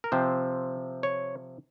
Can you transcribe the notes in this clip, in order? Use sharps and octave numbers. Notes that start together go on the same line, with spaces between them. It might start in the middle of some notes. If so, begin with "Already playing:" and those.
A#4
C3 F3 C4 C5
C#5